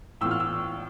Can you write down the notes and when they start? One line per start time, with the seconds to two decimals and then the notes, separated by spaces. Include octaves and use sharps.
0.21 A2 E3 B3 F4 E6
0.31 F6
0.40 E6